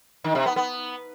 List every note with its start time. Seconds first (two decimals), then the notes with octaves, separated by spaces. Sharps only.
0.24 D#3
0.35 C3
0.46 B3
0.56 B3